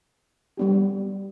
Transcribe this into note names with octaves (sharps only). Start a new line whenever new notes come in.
G3 B3 D4 G4